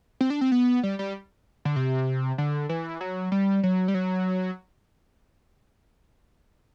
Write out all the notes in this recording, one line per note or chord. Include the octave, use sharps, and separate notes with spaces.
C4
D4
C4
B3
G3
G3
D3
C3
D3
E3
F#3
G3
F#3
G3
F#3